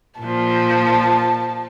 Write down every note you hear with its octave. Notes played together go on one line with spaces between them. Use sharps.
A#2 F3 A5